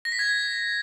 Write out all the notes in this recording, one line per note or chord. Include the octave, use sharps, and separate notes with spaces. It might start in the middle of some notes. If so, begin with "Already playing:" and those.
A#6
B6
G#6